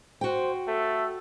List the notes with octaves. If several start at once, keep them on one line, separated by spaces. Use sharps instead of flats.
F#4 C5 G5
A3 A4